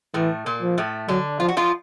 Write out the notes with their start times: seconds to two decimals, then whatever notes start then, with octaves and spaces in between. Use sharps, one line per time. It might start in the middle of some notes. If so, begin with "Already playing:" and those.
0.14 A2 E3 A3
0.46 A#2 A#3
0.62 F3
0.78 A2 A3
1.08 D3 F#3 D4
1.40 F3 F4
1.48 F#4
1.57 F3 F4